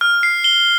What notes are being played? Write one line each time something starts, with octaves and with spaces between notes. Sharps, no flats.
F6
C7
G7